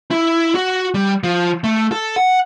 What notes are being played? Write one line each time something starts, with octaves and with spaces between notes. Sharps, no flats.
E4
F#4
G3
F3
A3
A4
F#5